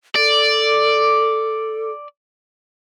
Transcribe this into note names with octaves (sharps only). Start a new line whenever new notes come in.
A4 D5